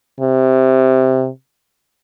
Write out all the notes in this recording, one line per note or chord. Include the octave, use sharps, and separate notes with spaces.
C3